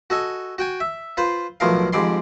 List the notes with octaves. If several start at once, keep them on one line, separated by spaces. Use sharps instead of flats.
F#4 A4 D#5 G#5
F#4 G5 G#5
E5
F4 B4 C5
B1 A2 F3 A#4 F5
F2 G#2 G3 D5 C6